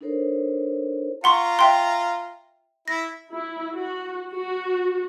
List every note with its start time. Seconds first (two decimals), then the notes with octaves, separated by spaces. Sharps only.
0.01 D4 D#4 A4 A#4 C5 C#5
1.24 F4 F#5 A#5 C6 C#6
1.59 E5 G5 C6
2.88 E4 A#6
3.33 E4
3.74 F#4
4.34 F#4